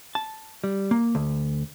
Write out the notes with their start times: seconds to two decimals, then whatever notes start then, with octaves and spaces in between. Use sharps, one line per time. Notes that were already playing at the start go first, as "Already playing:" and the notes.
0.15 A5
0.64 G3
0.91 A#3
1.15 D2